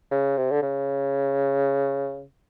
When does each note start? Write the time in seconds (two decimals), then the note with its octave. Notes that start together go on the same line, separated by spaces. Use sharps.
0.11 C#3
0.37 C3
0.52 D3
0.63 C#3